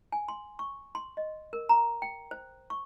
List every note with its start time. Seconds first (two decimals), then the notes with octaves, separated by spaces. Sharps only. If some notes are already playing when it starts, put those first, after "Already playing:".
0.12 G#5
0.28 C6
0.59 C#6
0.95 C6
1.17 D#5
1.53 A#4
1.69 A#5
2.02 G5
2.31 C5
2.70 C#6